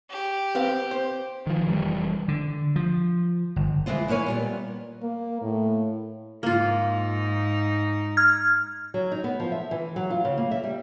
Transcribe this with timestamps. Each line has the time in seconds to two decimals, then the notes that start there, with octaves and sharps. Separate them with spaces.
0.10 G4
0.55 C4 B4 F5
0.91 C5
1.47 D#3 F3
1.68 F1 E3 G3
2.28 D3
2.76 F3
3.56 G1
3.86 E3 F3 G#3 C4 F4
4.08 G#2 A#3 B4 C#5 G#5
4.26 A#2 G3 B3
5.03 A#3
5.42 A2
6.43 G#2 A#3 D#4 F4
8.17 F6 G#6
8.94 F#3
9.12 D#4
9.24 B3
9.40 F3
9.52 E5
9.71 E3
9.96 F#3
10.10 F4
10.25 C#3
10.38 A#3
10.51 E5
10.64 G3